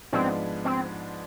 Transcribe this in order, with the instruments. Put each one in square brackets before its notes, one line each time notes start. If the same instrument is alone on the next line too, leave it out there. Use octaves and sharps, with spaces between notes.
[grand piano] G#2 F3 G#3 B3 D4 [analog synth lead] C4
[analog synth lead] C4